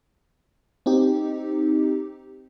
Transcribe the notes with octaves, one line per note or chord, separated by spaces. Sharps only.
C4 D#4 G4